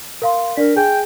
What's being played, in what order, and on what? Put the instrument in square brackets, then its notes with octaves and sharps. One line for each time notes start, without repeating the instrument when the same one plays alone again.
[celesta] A#4 F5 C6
[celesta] D4 D5 B6 [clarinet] A#4
[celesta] G#4 G#5 [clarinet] G5